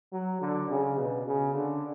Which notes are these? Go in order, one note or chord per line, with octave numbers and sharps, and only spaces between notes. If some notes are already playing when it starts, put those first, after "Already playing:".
F#3
D3
C#3
B2
C#3
D3